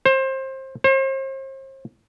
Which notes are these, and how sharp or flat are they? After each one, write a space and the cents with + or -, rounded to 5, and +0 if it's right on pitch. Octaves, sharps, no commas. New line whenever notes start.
C5 +25
C5 +40